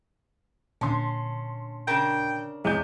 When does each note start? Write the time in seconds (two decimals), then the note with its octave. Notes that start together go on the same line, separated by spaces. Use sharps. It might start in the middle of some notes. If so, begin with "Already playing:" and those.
0.81 A#2 D3 C#4 A5 C6
1.88 C#3 D4 A#4 G5
2.65 E2 G#3 G6